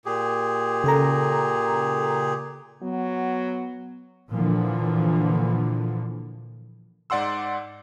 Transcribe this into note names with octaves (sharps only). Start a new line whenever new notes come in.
A#2 G4 G#4
C#3 A4 A#5
F#3 B3
A#2 D3 E3 F3
G#2 D5 F#5 C6 E6